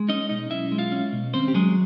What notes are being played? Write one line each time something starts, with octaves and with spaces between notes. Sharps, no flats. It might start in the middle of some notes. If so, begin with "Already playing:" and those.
Already playing: G#3
C#4 D#4 D#5
B2 D#4 D#5
B1 E4 E5
G#3
F4 F5
C#4
B2
D#2 C4 C5
G4
F#3 G#3 G#4